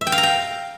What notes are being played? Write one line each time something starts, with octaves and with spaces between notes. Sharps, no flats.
E5
G5
F5
A#5
G5